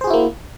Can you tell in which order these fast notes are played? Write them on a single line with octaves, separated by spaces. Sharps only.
C5 G#4 F#4 E4 A#3